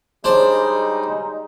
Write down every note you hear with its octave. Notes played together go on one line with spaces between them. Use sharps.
G3 G#3 D4 D#4 G#4 C5 C#5 C6